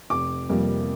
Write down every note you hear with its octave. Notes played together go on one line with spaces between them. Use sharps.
F1 D6
F2 C3 G3 A#3